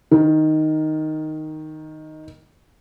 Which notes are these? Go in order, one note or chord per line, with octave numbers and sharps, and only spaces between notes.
D#3 A#4